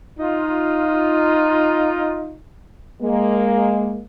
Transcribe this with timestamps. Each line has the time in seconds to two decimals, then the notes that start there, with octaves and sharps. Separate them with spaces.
0.19 D#4 F4
3.02 G#3 A#3